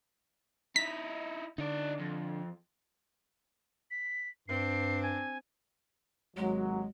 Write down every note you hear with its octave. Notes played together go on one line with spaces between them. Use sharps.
D#4 E4 B6
D3 D#4 D5
F2
B6
G2 C4 D4 C7
G#5
G#1 D#2 F#3 G#3